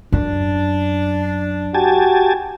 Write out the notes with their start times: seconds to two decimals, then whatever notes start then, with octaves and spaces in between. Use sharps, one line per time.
0.12 F#2 D4
1.74 F#4 G4 G#5 A5